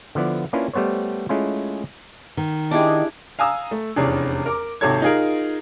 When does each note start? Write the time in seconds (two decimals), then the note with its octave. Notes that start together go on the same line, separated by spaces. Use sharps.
0.15 D3 F3 B3 E4 D5
0.53 A#3 C#4 D4 E4 F4 B4
0.73 G3 A3 B3 C5 C#5
1.29 G#3 A3 C#4 E4 F4
2.37 D#3
2.71 D4 E4 G4 G#4 D#5
3.39 F5 G#5 A#5 D#6 E6
3.71 A3
3.96 F1 E2 C#4 D4 G#4
4.46 A#4 D6
4.81 G#1 C3 A4 C#5 G#6
5.02 D#4 F4 G#4 A#4